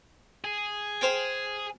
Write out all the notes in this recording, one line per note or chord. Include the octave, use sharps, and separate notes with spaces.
G#4
C5 F5 G5